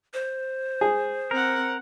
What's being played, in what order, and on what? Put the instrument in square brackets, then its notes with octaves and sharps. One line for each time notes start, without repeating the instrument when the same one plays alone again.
[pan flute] C5
[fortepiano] G#4
[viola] C4 F#5 [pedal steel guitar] A#4